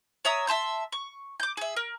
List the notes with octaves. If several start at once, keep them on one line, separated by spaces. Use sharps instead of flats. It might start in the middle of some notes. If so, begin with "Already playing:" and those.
C#5 E5 A#5 D#6
E5 A5 C6 G6
C#6
D6 G6
G#4 E5
A#4